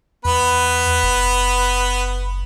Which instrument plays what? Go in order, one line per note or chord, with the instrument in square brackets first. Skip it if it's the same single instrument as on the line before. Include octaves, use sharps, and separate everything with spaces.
[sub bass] E2 [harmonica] B3 B4
[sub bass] F#1